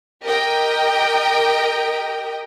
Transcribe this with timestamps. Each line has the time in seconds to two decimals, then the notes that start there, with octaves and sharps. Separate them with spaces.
0.24 G4 A#4 D#5 G5